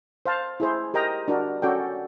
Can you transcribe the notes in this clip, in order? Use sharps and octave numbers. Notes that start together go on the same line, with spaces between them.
C5 F5 A5
E4 G#4 C5
G4 A#4 D#5 G5 A#5
D4 F#4 A#4
C#4 F#4 A4 D5 G5